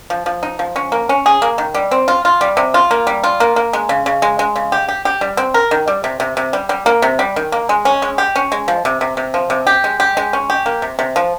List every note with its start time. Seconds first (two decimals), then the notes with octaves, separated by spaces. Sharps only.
0.10 F3
0.26 F3
0.43 D#4
0.59 F3
0.76 C#4
0.92 A#3
1.09 C#4
1.26 G#4
1.42 A#3
1.58 D#3
1.74 G3
1.91 C4
2.08 F4
2.25 F4
2.41 G3
2.57 C3
2.74 F4
2.91 A#3
3.07 G3
3.24 F4
3.40 A#3
3.56 A#3
3.73 G#3
3.89 C#3
4.06 C#3
4.22 G#3
4.39 G#3
4.56 C#3
4.72 G4
4.88 G4
5.05 G4
5.21 G3
5.37 C4
5.54 A#4
5.71 D#3
5.88 G3
6.04 C3
6.20 C3
6.37 C3
6.53 G3
6.69 G3
6.86 A#3
7.02 C3
7.19 G3
7.36 D#3
7.52 A#3
7.69 G#3
7.85 C#4
8.02 G#3
8.18 G4
8.36 C#4
8.52 G#3
8.68 F3
8.85 C3
9.01 C3
9.17 C3
9.34 F3
9.50 C3
9.67 G4
9.84 G#3
10.00 G4
10.17 G#3
10.33 C#4
10.50 G4
10.66 A#3
10.82 C3
10.99 C3
11.16 F3